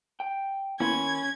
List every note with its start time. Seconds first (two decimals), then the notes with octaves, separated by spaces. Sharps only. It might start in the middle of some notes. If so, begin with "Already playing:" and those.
0.20 G5
0.80 D#3 A#3 B3 C#4 E4 B5 C6 G#6